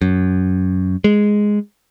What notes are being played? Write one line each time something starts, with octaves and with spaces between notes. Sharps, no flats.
F#2
G#3